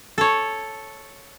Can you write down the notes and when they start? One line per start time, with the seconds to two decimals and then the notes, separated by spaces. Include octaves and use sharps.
0.18 A4 C#5